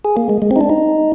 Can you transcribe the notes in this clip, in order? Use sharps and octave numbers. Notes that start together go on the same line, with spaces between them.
G#4
A#3
G#3
G#3
C4
D#4
D4
D#4